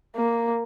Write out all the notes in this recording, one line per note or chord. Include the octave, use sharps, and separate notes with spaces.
A#3